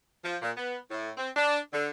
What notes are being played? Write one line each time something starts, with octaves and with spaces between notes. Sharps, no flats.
F3
A#2
B3
A2
C4
D4
D3